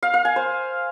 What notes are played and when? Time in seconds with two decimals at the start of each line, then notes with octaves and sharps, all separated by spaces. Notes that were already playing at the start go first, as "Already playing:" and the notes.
0.03 F5
0.14 F5
0.25 G#5
0.36 C5